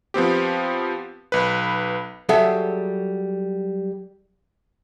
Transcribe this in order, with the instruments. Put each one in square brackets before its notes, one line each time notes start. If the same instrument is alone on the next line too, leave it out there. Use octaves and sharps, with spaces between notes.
[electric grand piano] F3 B3 C4 G4
B1 B4
[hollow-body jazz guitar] F#3 G3 G#4 A4 E5 F#5